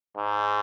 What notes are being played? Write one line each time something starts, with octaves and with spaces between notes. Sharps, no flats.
G#2